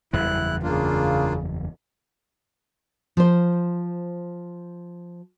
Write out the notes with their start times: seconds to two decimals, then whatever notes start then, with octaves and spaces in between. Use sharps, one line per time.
0.13 F#1 E2 G3 E4 F#6
0.63 C#3 A#3 D4 F4
3.17 F3 C5